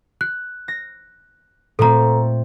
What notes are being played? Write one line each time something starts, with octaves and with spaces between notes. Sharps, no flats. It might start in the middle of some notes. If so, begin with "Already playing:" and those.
F#6
A#6
A#2 A3 C4 A4 A#5